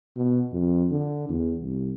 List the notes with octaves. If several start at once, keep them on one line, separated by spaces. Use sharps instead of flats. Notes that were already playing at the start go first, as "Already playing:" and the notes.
B2
F2
D3
E2
C2